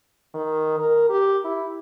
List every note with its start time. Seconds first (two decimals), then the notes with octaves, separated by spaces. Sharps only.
0.34 D#3
0.78 A#4
1.09 G4
1.44 E4